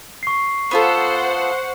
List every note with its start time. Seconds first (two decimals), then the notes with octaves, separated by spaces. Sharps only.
0.23 C#6 C7
0.71 B3 F4 A4 C5 F#5